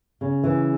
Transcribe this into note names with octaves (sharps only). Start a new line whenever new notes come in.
C#3
E3